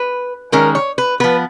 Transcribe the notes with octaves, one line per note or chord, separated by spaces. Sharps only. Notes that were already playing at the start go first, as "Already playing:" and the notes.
Already playing: B4
D#3 G#3 C#4 A#4
C#5
B4
F3 B3 B4